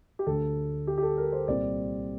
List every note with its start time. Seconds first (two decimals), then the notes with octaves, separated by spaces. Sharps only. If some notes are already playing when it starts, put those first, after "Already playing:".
0.19 G4
0.26 D2 D3 A3 A4
0.87 G4
0.98 G4
1.03 A4
1.17 A#4
1.32 C5
1.48 C2 A#2 G3 C4 D5